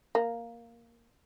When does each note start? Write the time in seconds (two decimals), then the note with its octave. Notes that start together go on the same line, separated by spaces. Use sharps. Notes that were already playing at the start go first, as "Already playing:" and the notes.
0.15 A#3